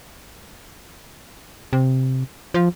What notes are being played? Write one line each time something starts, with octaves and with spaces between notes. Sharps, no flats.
C3
F3